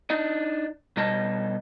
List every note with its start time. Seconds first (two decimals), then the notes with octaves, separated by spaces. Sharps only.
0.10 D4 D#4 D#5
0.97 B2 G3 D#5 A5